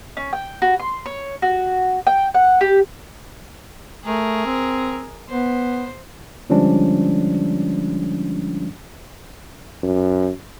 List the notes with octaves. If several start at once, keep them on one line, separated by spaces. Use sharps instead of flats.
C#4
G5
F#4
C6
C#5
F#4
G5
F#5
G4
A3 G#4 A#4
C4
B3 C5
D3 F3 G3 G#3 C#4 D4
F#2